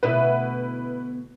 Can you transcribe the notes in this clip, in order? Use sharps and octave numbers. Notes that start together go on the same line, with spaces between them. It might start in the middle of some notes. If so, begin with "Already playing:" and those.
D2 B2 E4 B4 E5